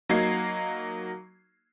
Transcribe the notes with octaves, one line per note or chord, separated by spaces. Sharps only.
F#3 A#3 D#4 G#6 C7